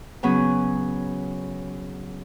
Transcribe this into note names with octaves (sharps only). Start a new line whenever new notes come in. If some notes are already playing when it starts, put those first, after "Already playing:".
C#3 F#3 B3 C#4 G#4